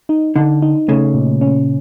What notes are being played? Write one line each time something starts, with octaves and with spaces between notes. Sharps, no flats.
D#4
D3 D#4
D#4
C#3 A3
A#2
C#4